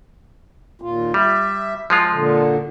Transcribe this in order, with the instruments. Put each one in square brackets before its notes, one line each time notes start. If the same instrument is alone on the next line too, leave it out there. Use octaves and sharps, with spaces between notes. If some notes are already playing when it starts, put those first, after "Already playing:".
[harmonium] D#2 A#2 F4
[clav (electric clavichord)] G3 [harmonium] E5
[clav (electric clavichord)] F3 G#3 F4
[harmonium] A#2 D3